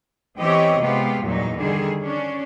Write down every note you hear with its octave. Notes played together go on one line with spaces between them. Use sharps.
E3 B3 C4 G4 C#5 D#5
C3 G#3 B3 F4 G4
E2 G2 A#2 F#3 D#4
D3 D#3 G3 G#4
C#4 D4